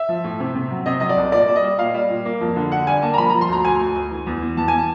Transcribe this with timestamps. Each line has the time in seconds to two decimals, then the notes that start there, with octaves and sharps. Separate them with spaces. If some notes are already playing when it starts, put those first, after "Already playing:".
Already playing: E5
0.09 F3
0.24 A2
0.40 C3
0.55 C3
0.71 F#3
0.86 C3 D#5
1.00 F#3 D#5
1.09 D5
1.17 C2
1.32 A#2 D5
1.48 G3
1.56 D#5
1.63 G3
1.79 A#2 F5
1.94 G3
2.10 A#2
2.25 A#3
2.41 F2
2.56 D3
2.72 D3 F#5
2.87 G3 G#5
3.02 A#3 A5
3.14 A#5
3.18 F3 B5
3.30 F3 A#5
3.41 C6
3.49 D2 A#5
3.64 D2 G#5
3.80 D2
3.96 D2
4.11 E3
4.27 E2
4.42 E3
4.57 E2 A5
4.68 G#5
4.79 A5